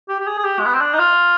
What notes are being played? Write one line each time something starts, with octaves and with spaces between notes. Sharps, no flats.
G4
G4
G#4
G#4
G4
G#3
B3
C4
D4
D#4
F4